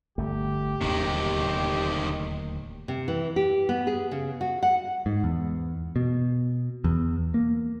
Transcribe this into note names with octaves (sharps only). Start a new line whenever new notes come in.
G1 D3 A3 G4
D1 D#2 C3 D#3
C3
E3
G4
B3
G#4
C#3
F#4
F#5
G#2
E2
B2
E2
A#3